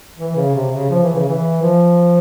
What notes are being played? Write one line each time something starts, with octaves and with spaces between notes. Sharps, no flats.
E3
C#3
C3
C#3
F3
E3
C#3
E3
F3